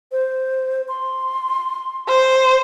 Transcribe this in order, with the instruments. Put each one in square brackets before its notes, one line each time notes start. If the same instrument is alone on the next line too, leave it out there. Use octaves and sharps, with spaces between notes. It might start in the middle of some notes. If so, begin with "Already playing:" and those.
[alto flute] C5
C6
[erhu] C5